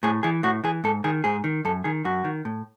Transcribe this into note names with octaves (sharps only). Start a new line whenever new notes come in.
A2 G#4
E3 G#4
A2 F#4
E3 G#4
G#2 A4
D#3 G#4
G#2 G#4
D#3
F#2 A4
D#3 G#4
F#2 F#4
D#3
A2